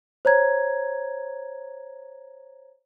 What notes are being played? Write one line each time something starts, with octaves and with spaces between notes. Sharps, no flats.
C5 C#5 A#5 G#6